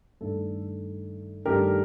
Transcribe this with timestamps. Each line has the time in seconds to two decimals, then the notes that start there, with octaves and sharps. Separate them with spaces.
0.21 G2 D#3 A3 A4
1.45 G2 D#3 A3 G4 A#4